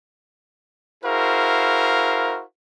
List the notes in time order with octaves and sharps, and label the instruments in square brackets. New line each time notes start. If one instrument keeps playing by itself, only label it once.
[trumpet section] E4 F#4 G#4 A#4 C5 F5